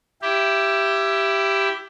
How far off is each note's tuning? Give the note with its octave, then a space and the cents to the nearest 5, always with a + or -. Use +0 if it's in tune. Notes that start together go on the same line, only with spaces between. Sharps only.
E4 +20 G4 +0